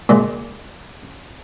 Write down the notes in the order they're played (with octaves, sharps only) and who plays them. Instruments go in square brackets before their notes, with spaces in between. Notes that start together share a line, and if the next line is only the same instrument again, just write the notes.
[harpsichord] A#2 G#3